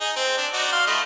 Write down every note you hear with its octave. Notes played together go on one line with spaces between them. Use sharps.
D#4 G#4
C4
D4
D#4 F#4 D5
F5 C6
A3 E4 D#5